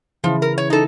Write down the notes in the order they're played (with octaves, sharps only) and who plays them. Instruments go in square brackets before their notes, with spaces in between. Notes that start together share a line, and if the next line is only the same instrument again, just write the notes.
[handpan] C#3 E3 E4 [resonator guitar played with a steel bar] F3
[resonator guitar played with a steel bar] A#4
C#5
D#4 A4